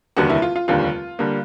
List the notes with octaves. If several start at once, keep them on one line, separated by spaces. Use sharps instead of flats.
F1 D#2 D3 G3 A#3 F#4
E4
F4
F4
F1 D#2 D3 G3 A#3 F4
D3 G3 A#3